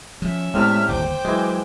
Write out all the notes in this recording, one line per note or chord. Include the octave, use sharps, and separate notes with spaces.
F3 C#4 E5
A2 C3 G#3 B3 D5 F6
G1 D#2 C5 G5 D6
E3 F#3 G#3